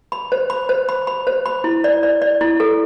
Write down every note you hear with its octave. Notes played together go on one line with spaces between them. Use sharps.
B5
C5
B5
C5
B5
B5
C5
B5
E4
D5
D5
D5
E4
A4